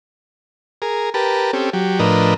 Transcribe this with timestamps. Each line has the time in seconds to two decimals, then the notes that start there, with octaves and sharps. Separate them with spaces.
0.82 G#4 A#4
1.14 G4 A#4 B4 A5
1.53 C4 C#4 G4 A4
1.73 F#3 G4
1.99 A2 F3 D4 A#4 B4 D#5